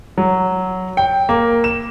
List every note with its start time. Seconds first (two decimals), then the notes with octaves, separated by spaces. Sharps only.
0.18 F#3
0.97 G5
1.29 A#3
1.64 E7